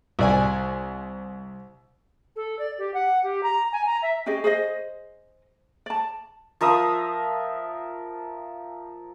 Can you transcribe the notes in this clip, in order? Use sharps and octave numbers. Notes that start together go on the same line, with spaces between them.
C2 D5 G#5
A4
D5
G4
F#5
G4
A#5
G#5
A#5
E5
C#4 G4 G#4 D#5
G#4 C5 D#5
D5 A5
F3 A#4 E5 D#6